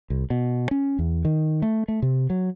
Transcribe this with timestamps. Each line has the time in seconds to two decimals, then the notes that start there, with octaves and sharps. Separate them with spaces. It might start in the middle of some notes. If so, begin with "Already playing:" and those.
0.10 C2
0.30 B2
0.71 C#4
0.99 E2
1.25 D#3
1.62 A3
1.88 A3
2.02 C3
2.30 F#3